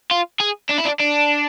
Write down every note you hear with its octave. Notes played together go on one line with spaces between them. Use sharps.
F4
G#4
D4
E4
D4
D4